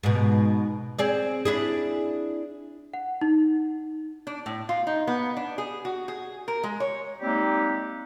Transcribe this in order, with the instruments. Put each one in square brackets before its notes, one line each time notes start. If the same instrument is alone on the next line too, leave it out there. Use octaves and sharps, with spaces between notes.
[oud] G#2 B2
C4 G#4 D5
D4 E4 G#4
[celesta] F#5
D#4
[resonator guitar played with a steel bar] D4
A2
F4
D#4
B3
D4
G#4
F#4
G#4
A#4
G#3
C#5
[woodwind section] G3 G#3 A#3 C4 D#4 G4